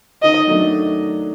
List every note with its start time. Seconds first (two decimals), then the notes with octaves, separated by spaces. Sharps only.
0.22 D#3 D#5
0.47 F#3 A3 D4